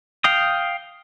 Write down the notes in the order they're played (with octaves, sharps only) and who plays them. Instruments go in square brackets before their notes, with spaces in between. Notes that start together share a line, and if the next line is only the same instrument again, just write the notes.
[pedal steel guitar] F5 G5 D#6